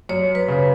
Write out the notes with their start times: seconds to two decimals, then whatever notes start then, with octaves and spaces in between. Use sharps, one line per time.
0.09 F#2 C#5
0.35 B4
0.48 C#3